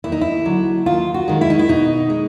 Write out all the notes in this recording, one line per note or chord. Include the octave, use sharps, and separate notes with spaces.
D#2 E4
D#4
E4
D3 F#3
D#2 F4
F#4
D#3 G#3
E4
D#4
E4
B2 D#4
G#3